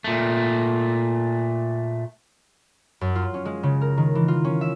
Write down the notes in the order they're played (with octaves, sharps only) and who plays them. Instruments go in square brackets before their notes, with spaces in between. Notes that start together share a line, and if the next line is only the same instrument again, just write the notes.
[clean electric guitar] A#2 A3
[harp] F#2
F4
C#4
G#3
C#3
A#4
D#3
E3
F4
C#4
E5